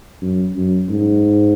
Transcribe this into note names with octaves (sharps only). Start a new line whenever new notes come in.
F#2
F#2
G#2